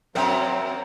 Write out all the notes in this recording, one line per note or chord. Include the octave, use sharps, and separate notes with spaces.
F#2 F#3 A#3 C4 A#4 E5 G5